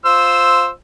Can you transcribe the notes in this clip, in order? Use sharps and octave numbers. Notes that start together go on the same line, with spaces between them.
F4 C5 E6